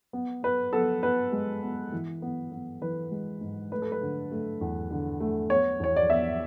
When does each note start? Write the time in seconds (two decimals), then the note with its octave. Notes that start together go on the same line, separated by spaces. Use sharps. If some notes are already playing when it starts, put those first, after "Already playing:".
0.13 B3
0.43 B3 B4
0.73 B3 A4
1.03 B3 B4
1.32 G#3
1.63 B3
1.92 E3
2.22 B3
2.52 B3
2.81 E3 B4
3.11 G#3
3.41 G#2
3.72 A3 B4
3.82 A4
3.92 B4
4.01 D3
4.31 A3
4.61 E2
4.91 D3
5.20 A3
5.50 B3 C#5
5.80 E2 C#5
5.96 D5
6.10 B3 E5